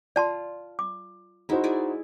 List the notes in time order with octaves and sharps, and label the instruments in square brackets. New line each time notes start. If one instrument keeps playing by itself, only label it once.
[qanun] F4 [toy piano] D5 A5 C6
[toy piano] D6
[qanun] G#3 E4 [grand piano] D#4 F#4 C5
[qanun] E4 G#4 D5